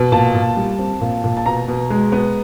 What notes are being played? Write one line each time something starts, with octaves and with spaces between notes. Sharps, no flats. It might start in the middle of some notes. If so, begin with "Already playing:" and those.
Already playing: B2
A#2 A5
A#2
G3
C4
A#2
A#2
A5
B2 A#5
B2
G#3
B3